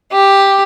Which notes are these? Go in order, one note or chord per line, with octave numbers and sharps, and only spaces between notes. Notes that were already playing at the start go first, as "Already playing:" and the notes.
G4